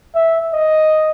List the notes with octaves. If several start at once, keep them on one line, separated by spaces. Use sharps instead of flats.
E5
D#5